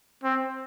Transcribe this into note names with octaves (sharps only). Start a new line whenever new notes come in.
C4